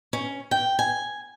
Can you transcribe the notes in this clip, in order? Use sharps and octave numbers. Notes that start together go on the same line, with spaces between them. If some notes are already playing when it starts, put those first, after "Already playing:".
C#4
G5
G#5